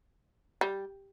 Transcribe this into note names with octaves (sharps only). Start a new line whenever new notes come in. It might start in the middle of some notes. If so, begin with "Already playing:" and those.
G3